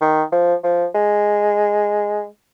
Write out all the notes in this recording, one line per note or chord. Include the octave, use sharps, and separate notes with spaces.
D#3
F3
F3
G#3